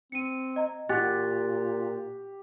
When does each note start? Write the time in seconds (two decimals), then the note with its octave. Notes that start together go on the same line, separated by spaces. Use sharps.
0.12 C4 C#7 D#7
0.56 D#5 A#5
0.89 A#2 G4 G#5 F#6 A6